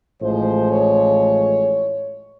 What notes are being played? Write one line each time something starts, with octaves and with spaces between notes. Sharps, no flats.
A1 A2 F3 G#3 C5
C#5